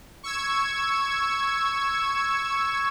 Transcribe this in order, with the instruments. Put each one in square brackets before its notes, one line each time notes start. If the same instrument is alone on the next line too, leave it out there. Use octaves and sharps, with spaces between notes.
[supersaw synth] C#6 E6 G#6